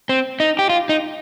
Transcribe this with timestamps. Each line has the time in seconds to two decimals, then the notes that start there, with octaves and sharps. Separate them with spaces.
0.09 C4
0.40 D#4
0.59 G4
0.70 F4
0.89 D#4